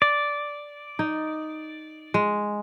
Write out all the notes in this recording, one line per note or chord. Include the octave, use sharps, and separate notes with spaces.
D5
D#4
G#3